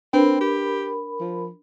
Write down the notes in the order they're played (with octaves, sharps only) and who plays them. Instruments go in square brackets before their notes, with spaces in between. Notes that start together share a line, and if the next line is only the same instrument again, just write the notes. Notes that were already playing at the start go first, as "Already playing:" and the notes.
[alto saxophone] C4 [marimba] D4 B4 G5 [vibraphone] A#4 B5
[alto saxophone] G4
F3